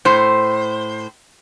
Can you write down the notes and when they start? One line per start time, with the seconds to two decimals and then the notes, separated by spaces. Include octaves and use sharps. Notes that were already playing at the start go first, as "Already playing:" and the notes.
0.05 A2 C5